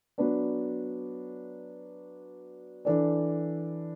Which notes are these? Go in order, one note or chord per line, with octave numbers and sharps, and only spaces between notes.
F#3 B3 D4 B4
E3 D4 A4 D5